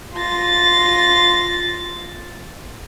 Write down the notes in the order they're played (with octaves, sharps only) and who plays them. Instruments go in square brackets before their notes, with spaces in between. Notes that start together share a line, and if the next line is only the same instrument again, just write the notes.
[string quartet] F4 C6 A6 A#6